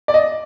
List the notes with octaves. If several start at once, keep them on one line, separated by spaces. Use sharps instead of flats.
D5
D#5